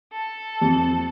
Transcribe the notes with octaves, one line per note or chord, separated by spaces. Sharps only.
A4
F2